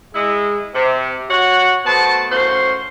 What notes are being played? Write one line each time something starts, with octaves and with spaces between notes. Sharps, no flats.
G#3 E4
C3
F#4 C#5 F#5
A3 B3 F#4 C5 A5
F#2 A2 F3 F#4 C5 C6